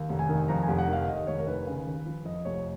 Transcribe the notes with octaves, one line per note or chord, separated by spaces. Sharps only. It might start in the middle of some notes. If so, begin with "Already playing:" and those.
Already playing: D#2
F1
G#5
D#3
F2 A#5
G#5
F1
F#5
D#3 F5
D#2 D#5
F1 C#5
A#4
D#3 B4
C#3
D#2
F3
F2 D#5
F1 C#5